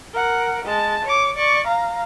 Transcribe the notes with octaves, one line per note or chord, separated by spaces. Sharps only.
A#4 F#5
G#3 A5
C#5 D6
D5 C#6
F5 A#5